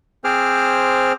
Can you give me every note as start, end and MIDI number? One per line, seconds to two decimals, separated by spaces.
0.24 1.12 60
0.24 1.12 68
0.24 1.12 72
0.24 1.12 86
0.24 1.12 89